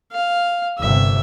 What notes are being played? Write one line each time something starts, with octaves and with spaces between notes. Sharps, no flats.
F5
G1 C3 E5